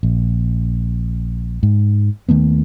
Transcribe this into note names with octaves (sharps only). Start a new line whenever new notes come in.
A#1
G#2
D#2 D#3 A3 B3